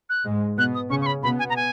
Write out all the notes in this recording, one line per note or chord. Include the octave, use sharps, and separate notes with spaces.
F#6
G#2 G#3
B2 B3 F#6
D#6
C#3 C#4 C#6
C#6
B5
B2 B3 B5
G#5
A#5
G#5